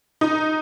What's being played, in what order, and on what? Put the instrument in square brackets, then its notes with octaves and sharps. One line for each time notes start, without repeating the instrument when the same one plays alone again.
[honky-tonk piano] D#4